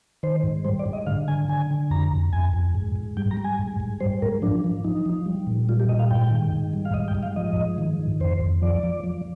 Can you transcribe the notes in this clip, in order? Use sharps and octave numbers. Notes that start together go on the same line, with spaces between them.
D#3 C5
G#2
G3 C5
D5
G#2
D#5
D3 F5
D3 G#5
D3 G#5
D3
F2 A#5
F2
F2 G#5
F2
G#2
G#2
G3 G5
A#5
G3
G#5
G#2
G#2
G3 C5
G#2 A#4
F3 D4
F3
F3 D#4
F3
G3
A#2
G3 F4
G4
A#2 D#5
F5
G#2 G5
D#3
G#2
G3
F5
G#2 D#5
G5
G#2
F5
F3 D#5
G#2
D#3
D#3
F2 C5
F2
F3 D5
F3
F3